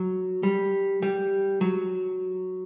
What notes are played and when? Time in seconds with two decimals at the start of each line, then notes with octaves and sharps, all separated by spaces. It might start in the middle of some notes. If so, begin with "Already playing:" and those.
Already playing: F#3
0.43 G3
1.02 G3
1.61 F#3